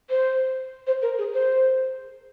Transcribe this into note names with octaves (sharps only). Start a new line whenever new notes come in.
C5
C5
A#4
G#4
C5